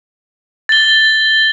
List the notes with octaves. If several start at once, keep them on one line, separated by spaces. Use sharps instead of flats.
A6 G7